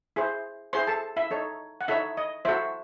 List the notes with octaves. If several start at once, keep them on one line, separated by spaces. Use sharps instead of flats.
E4 G#4 C5
E4 G#4 C5 C6
A4 A5
E4 E5
D#4 A4 C#5
F#5
D#4 E4 A4 C#5 E5
D#5
E4 F#4 A4 C5 E5